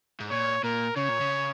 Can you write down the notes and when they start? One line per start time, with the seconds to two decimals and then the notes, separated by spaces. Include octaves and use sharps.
0.20 G#2
0.31 A#2 C#5
0.64 A#2 A#4
0.97 C#3 C#5
1.09 A#2
1.20 C#3